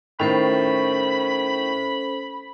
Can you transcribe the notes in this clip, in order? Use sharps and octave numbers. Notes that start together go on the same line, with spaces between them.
A2 D#3 C#4 A4 C5 B5